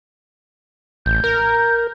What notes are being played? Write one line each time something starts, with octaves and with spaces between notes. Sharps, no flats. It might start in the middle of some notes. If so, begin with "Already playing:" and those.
A1 G6
A#4